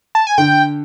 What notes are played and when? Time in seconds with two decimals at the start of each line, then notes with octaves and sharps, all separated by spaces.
0.15 A5
0.27 G#5
0.38 D3 G5